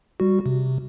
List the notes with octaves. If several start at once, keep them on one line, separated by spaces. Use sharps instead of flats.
G3 F#4
C3